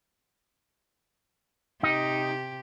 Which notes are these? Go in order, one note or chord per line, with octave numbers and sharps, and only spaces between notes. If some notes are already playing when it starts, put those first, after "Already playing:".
C3 D#4 G4